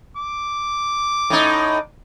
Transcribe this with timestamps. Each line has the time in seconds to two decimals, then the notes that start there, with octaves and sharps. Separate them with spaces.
0.17 D6
1.30 A2 D#4